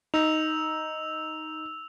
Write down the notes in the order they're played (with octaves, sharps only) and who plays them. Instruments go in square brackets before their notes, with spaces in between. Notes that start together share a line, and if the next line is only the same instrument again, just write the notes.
[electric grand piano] D#4 [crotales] E6 F7